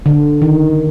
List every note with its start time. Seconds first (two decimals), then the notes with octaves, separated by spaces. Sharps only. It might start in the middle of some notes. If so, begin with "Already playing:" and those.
0.06 D3
0.42 D#3